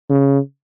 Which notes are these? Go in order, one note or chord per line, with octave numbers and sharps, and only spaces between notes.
C#3